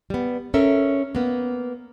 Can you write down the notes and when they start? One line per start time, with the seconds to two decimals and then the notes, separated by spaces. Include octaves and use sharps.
0.10 G3 B3
0.54 C#4 A4 A#4 E5
1.15 A#3 B3